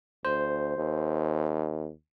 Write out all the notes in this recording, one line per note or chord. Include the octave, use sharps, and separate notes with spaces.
D2 C5
D#2